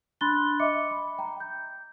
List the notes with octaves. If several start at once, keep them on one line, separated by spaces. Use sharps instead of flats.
D4 B5 C6 F#6 A6 G7
D#5 E5 D6 C#7
B5
G5 A#5
G6